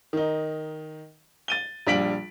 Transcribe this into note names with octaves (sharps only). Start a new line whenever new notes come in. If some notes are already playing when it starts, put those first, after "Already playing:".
D#3 D#4
A6 D#7 G7
A#1 G3 D4 B6 D7 F#7